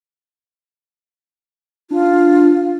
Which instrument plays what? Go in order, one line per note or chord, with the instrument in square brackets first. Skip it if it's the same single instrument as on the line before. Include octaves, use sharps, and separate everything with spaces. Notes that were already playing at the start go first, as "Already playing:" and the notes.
[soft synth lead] D4 [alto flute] F4